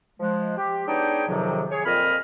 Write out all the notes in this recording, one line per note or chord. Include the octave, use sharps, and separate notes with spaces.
F3 G#3
G4
B3 D4 D#4 G#4 C#5 G5
F2 G#2 C3 D#3 F3 F#3
G#4 C#5
F2 A#2 C4 D#5 B5 F6